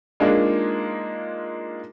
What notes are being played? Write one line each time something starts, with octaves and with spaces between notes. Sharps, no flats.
G#3 A#3 D4 D#4 F4 G#4